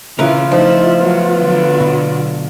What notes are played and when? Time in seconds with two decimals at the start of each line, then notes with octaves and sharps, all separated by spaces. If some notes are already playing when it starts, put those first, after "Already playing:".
0.19 C#3 E3 F4 A#4 B4
0.52 F3 A3 D#4 E4
1.00 F#3 B3
1.37 D3 F#3
1.80 B2